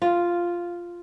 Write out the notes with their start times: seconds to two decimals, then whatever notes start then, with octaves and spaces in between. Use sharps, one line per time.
0.02 F4